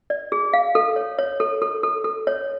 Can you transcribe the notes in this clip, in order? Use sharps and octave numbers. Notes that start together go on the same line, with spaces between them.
D5
G#4
F5
A4
C#5
C#5
A4
A4
A4
A4
C#5